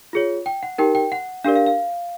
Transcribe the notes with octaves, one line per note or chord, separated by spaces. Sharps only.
F4 G#4 C#5
G5
F#5
D#4 G4 A#4 G5
G5
F#5
D4 G4 A#4 D5 F5
F5
F5